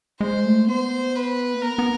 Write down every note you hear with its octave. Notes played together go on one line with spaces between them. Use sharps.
G#3 C5
A3
B3 C5
B4
A#3
B3 A#4
B3